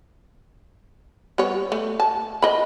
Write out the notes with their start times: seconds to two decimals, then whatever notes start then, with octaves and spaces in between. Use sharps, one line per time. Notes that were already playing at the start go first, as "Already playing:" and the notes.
1.38 G3 B3 C#5
1.72 A3
2.00 A5
2.42 A#4 D#5 B5